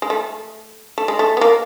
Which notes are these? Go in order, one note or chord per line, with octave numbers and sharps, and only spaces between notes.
G#3
A3
A3
G#3
A3
B3
A#3